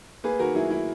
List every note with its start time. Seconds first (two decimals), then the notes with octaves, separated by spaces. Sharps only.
0.24 A#3 G#4 B4
0.39 D#3 F#4 A#4
0.55 F#3 E4 G#4
0.70 E4